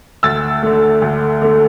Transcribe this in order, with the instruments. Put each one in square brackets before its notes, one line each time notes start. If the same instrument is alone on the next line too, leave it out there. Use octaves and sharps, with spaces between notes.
[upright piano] D2 E6 A6
D3 A3
D2
D3 A3